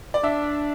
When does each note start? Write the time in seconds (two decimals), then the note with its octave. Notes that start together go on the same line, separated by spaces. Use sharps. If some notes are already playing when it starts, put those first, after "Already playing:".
0.14 D5
0.23 D4 E5